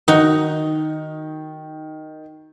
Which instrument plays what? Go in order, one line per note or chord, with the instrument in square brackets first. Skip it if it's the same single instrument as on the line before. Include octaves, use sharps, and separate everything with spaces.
[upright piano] D#3 [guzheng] D#4 F#4